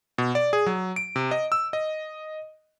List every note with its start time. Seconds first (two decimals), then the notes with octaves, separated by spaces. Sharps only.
0.18 B2
0.35 D5
0.53 G#4
0.66 F#3
0.96 D7
1.16 C3
1.31 D#5
1.52 E6
1.73 D#5